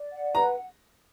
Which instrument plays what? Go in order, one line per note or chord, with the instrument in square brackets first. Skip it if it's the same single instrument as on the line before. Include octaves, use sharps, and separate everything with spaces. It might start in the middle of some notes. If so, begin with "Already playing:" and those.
Already playing: [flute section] D5
F#5
[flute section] B4 [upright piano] A#5